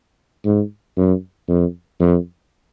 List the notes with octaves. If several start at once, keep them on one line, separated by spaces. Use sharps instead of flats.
G#2
F#2
F2
F2